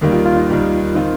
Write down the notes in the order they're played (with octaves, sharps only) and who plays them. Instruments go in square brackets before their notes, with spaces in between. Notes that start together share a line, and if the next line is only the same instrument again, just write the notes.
[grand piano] D#2 D#3 G3 A#3
[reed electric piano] F4
F4
D#4
[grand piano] D#2 D#3 G3 A#3
[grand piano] D#3 C4 F4 [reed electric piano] D#4